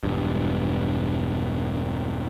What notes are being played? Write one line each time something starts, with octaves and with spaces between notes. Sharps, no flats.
E1 G2